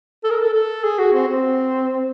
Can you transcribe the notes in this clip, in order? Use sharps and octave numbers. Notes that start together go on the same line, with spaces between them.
A4
A#4
A4
A4
G#4
F#4
C4
C4